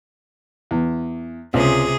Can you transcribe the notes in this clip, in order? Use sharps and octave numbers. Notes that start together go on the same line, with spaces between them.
E2
C#2 C3 G#4